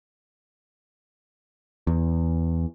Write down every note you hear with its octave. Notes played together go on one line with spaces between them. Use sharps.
E2